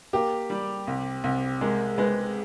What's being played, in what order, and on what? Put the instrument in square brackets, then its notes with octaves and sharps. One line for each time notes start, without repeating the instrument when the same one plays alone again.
[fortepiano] A#3 [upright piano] G4
[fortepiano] G3
C2
C2
[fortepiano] G#3 [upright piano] A#4
[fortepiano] G#3 [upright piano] B4